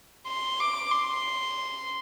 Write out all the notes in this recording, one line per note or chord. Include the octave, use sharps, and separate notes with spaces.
C6
D6
C6